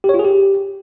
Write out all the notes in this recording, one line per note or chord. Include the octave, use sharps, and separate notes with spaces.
G4
C#5
F4
G#4
G4